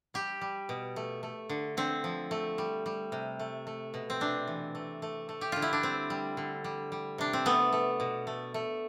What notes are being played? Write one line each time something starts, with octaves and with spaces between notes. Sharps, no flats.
G3 G4
G3
B2
A3
A3
D3
D3 C4
F3
A3
G3
G3
C3
A3
A3
B2
C4
C3 D4
E3
A3
A3
A3
G4
D3 F4
E4
D4
G3 C4
G3
D3
G3
G3
C3 D4
C4
A3 B3
A3
B2
A3
A3